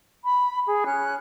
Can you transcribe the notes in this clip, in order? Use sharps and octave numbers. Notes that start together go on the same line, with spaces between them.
B5
G#4
C#4 F#6